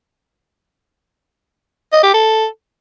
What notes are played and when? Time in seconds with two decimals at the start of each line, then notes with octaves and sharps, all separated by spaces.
1.93 D#5
2.03 G4
2.14 A4